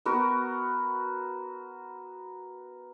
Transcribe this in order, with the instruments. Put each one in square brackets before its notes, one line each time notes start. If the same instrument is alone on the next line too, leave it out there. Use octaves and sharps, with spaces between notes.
[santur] B3 F#4 A#4